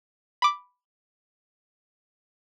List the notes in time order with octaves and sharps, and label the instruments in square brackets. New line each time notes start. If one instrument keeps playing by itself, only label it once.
[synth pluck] B5 D6